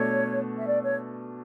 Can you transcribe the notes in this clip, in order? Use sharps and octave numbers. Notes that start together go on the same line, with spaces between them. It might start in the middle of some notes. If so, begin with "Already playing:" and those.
Already playing: B2 A3 D4 A4 C#5
E5
D5
C#5